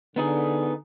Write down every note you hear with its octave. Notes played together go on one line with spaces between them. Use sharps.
D3 B3 D#4 G#4